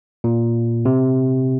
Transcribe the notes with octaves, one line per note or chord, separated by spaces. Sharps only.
A#2
C3